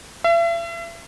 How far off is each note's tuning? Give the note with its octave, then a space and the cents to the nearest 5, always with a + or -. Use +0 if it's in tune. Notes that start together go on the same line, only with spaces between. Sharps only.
E5 +40